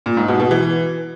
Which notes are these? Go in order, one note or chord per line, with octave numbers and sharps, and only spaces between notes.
A#2
G#2
B2
B2
E3